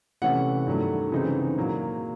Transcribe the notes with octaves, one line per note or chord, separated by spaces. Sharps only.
C3 E3 A3 C#4 F#5
G2 D#3 F#3 A3
C#3 E3 G#3 C4 D#4
A#2 F#3 A#3